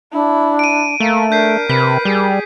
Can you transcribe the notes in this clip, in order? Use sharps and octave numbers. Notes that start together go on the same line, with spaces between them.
D4 E4
D7 D#7
A3 A#3
D4 A#4 G6 B6 C7
C3 B4 B6
G3 G#4